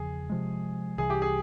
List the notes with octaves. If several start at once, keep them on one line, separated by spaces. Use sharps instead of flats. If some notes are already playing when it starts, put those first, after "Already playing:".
Already playing: E2 C#3 F3 G#4
C3 F3 G#3
C2 C3 E3 G3 G#4
G4
G#4